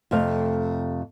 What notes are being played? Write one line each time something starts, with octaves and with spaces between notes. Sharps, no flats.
F2 C3 A3 F5